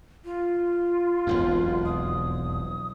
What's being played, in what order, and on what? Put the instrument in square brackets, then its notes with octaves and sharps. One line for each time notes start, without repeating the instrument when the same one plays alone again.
[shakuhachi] F4
[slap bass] E1 B1 F2
[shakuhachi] D#6